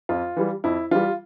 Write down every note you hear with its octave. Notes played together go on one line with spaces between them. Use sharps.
F2 F4
E3 G3
F2 E4
E3 G3 F4